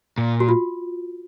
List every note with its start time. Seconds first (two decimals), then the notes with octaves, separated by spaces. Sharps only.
0.18 A#2
0.40 F#4
0.49 F4